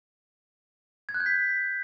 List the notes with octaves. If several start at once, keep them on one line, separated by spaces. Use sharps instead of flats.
G#6
F#6
G6
B6